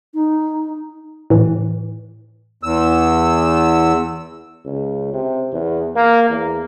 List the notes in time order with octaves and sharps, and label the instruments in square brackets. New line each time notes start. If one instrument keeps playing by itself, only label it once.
[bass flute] D#4
[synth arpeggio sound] A2 E3
[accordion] E2 E6
[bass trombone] C#2
C3
E2
A#3
E2